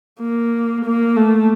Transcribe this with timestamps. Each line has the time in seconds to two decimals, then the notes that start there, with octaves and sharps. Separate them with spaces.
0.21 A#3
0.85 A#3
1.17 A3